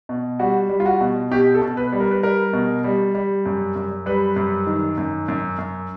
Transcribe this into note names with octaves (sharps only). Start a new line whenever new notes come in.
B2
G3 F#4
G3
F4
F#4
B2
B2 G4
A4
B2
B4
G3
A#4
B4
G3 A#4
B2
G3
G3
F#2
F#2
G3 B4
F#2
D#3
F#2
F#2
F#2